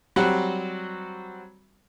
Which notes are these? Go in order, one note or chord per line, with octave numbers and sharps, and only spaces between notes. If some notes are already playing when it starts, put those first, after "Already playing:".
F#3 G3 C4 F#4